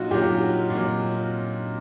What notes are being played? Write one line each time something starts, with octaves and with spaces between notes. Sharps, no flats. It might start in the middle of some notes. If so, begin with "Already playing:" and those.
Already playing: A#2 F#3 D#4 F4 F#4
A#2 F#3 G4
A#2
F#3